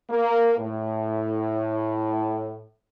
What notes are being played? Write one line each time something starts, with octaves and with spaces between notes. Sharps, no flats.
A#3
A2